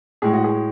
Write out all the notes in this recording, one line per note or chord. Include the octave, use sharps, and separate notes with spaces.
A2 G#3 G#4
F#4
G#4